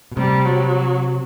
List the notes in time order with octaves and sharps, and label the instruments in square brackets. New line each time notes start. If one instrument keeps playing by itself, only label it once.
[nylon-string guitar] B2
[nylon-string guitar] C3 [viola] G3
[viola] F#3